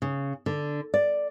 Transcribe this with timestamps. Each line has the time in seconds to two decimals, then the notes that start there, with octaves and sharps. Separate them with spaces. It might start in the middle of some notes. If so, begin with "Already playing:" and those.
0.02 C#3
0.46 D3
0.94 D5